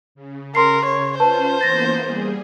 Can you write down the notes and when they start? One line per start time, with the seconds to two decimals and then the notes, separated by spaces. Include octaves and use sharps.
0.15 C#3
0.55 A#4 C6 C7
0.85 C#5
1.20 C#4 F4 B4 C5 A5
1.61 E3 A#3 B3 A6 A#6
2.02 G3 G#4